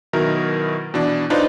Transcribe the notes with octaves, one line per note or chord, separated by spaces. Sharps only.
B2 D#3 F#3 E4 A#4
B2 E3 D4
D4 D#4 F4 B4 C5